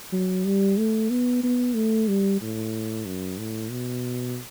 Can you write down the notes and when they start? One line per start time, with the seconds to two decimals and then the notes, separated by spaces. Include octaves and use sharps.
0.12 F#3
0.46 G3
0.77 A3
1.10 B3
1.43 B3
1.75 A3
2.08 G3
2.41 A2
3.06 F#2
3.38 A2
3.71 B2